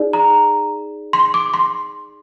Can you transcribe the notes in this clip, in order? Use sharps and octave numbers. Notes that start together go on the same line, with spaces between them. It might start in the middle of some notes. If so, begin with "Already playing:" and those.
Already playing: D#4 G#4 D5
A#5
C6
D6
C6